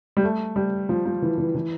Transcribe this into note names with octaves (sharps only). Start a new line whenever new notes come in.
G3
A3
G3
F3
F3
E3
E3
E3